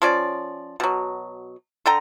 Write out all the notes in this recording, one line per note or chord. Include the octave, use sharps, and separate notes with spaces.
F3 C#4 D5
B2 F#3
D3 A4 G5 A#5